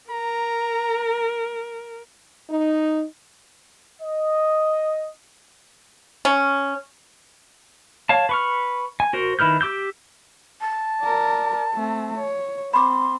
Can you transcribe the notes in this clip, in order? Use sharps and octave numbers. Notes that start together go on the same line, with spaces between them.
A#4 A#5
D#4
D#5
C#4
C#5 F5 A5
B4 C#6 F6
G#5
F#4 A#4 C5
D#3 E4 B4 F6 G6
G4 D6 E6 G6
A5
A#4 D5
A3 C4
C#5
C4 B5 C6 D6